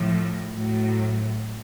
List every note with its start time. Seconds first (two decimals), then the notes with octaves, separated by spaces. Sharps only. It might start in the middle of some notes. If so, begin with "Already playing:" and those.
Already playing: A2 F3
0.53 A2 F#3